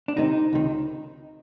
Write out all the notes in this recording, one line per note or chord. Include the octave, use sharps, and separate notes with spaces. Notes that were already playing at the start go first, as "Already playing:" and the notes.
D4
C2 C3 D#3 D#4
C#2 C3 D#3